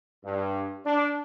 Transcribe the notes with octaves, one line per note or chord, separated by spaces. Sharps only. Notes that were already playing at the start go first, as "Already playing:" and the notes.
G2
D4